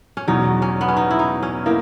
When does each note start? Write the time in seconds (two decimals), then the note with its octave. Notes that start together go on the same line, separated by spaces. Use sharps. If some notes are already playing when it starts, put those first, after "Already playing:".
0.17 C#4
0.28 E2 B2 F#3 D#4
0.62 C#4
0.81 B3
0.88 C#4
0.97 D#4
1.11 E4
1.19 D#4
1.43 C#4
1.66 A#3 D#4 E4